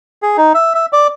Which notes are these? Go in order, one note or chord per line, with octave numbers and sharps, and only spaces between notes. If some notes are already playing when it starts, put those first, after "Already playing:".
G#4
D#4
E5
E5
D5